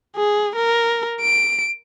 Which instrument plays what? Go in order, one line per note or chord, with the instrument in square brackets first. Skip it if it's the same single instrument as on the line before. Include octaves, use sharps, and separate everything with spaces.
[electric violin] G#4
A#4
D7